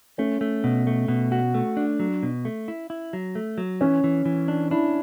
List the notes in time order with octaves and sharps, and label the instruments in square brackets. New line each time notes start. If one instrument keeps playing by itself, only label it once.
[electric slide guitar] A3 [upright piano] C#4
[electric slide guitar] A3
B2
A3
B2
F#4
A3
D4
F#3
B2
A3
E4
E4
F#3
A3
F#3
[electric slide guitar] E3 [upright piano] C#4
[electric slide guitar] E3
E3
D4
[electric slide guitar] D4 [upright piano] E4